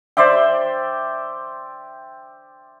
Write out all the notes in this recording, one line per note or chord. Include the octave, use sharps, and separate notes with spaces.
C5 D5 E5 G5